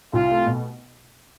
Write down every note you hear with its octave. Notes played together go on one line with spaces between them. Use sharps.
C2 F4
A3
B2